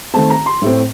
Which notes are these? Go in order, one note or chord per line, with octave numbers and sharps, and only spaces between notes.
D#3 A3 C4 A5
A#5
C6
A2 A3 C4